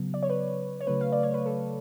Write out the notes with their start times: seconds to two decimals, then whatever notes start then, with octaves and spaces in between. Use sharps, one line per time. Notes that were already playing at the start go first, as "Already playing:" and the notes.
Already playing: C#3 F#3 B3
0.14 D5
0.23 C#5
0.30 B4
0.81 C#5
0.87 C#3 F#3 A3 B4
1.01 F5
1.12 D5
1.23 C#5
1.34 B4
1.46 A4